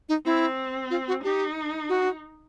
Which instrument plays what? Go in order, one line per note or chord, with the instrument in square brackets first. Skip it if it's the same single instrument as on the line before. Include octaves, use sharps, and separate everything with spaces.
[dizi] D#4
[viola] C4 [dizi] E4
[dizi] F4
F#4
[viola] D#4 [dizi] G4
[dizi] F#4